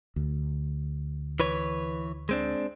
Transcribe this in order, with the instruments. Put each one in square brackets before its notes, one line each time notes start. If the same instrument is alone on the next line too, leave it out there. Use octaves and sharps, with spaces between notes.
[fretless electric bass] D2
[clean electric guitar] E3 B4 C#5
G#3 C4 D4